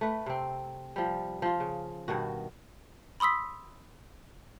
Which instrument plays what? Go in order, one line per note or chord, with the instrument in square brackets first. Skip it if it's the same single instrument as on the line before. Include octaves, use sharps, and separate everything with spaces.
[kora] A3 B4
C3 C4
F3 G3
F3 F4
C#3
G2 B2 D#3 F#4
[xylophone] B5 C6 D#6 E6 B6